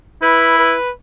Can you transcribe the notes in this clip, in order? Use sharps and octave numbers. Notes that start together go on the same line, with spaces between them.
E4 B4
B4